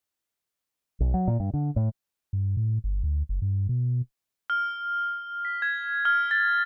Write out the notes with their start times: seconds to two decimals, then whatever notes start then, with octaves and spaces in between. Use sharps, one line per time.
1.00 B1
1.14 F#3
1.27 A#2
1.40 G2
1.54 D3
1.76 A2
2.33 G2
2.57 A2
2.84 G1
3.03 D2
3.29 F#1
3.42 G2
3.69 B2
4.50 F6
5.45 B6
5.62 G#6
6.05 F6
6.31 A6